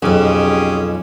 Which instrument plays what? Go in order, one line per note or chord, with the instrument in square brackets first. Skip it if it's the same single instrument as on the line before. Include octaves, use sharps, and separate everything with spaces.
[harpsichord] B1 F2 [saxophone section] C#4 G4 G#4